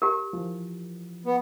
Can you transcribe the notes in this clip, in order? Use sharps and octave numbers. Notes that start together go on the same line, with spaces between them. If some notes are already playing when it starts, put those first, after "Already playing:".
G4 A#4
E3 F3
B3